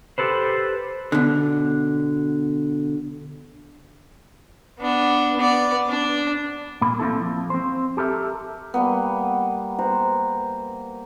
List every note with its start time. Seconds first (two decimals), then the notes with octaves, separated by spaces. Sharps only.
0.18 G4 A4 B4 C5
1.12 B2 D3
4.79 B3 D4
5.37 B3 D5
5.89 D4
6.81 A#2 A#3 B5
7.00 A#3 C4 E4 A4
7.20 F3
7.50 C4 C5
7.97 G4 A4 A#4 E5
8.74 G3 A#3 B3
9.79 C5 F#5 A#5